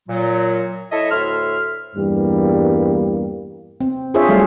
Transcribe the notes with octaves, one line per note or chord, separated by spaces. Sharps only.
A#2 F#3
E4 A4 C#5 D#5 E5
D2 A2 E5 C6 F6
E2 G2 G3 A#3
C4
D4 F4 G#4 C5 C#5 E5
F#3 G3 A3 G#4 F5